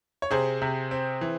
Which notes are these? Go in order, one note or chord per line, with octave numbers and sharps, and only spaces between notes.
C#5
C3 G#4 C5
C3
C4
E3